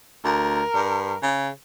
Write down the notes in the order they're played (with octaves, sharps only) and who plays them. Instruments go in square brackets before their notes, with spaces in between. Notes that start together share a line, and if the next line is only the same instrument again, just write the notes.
[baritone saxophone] D2 [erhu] A#4
[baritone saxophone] G2
C#3